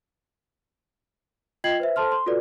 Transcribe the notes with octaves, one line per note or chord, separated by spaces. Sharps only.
F4 D#5 G5 G#6 C7 F#7
B4 C5 E5
A4 C5 A5 C6 F6
C6
F4 F#4 A4 B4 D5